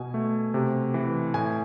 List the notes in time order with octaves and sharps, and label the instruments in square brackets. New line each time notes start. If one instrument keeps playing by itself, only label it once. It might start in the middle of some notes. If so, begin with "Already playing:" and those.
Already playing: [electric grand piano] B2 G#5
A3
C3
E3
A2 G#5